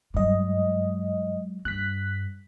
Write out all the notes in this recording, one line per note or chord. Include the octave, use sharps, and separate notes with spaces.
G2 F#3 G#3 D#5
G2 F#6 B6